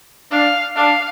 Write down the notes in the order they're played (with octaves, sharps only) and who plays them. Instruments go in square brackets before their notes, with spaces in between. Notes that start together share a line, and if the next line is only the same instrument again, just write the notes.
[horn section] D4 [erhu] F5
[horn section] D4 [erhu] F5